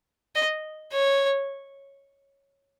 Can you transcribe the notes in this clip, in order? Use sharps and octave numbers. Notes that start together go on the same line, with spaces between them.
D#5
C#5